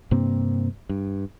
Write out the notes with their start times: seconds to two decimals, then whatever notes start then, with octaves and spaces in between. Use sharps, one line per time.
0.11 G2 C3 A#3 C4
0.89 G2